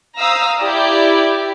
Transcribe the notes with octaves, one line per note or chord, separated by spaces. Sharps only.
C5 F5 A#5 D#6 E6
E4 G4 D5